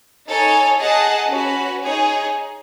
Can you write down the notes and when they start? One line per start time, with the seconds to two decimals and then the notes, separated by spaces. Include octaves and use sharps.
0.28 D#4 A4 C#5 G#5
0.80 G#4 D#5 F#5 A5
1.31 C#4 F#4 B4
1.83 D#4 G#4 C#5